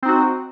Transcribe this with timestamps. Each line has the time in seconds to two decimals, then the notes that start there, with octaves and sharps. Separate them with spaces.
0.03 C4
0.05 D#4
0.08 F#4